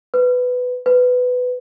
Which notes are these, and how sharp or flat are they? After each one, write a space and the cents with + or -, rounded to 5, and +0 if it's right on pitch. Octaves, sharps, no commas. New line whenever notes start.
B4 +10
B4 +15